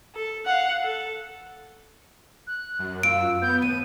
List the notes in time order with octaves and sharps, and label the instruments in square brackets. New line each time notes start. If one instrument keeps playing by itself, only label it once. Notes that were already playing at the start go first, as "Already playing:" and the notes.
[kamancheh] A4
F5 F#5
A4
[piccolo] F#6
[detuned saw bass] F#2
[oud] F4 [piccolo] E6 [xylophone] D7
[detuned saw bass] B3 [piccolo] G6
[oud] D#2 [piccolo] D#7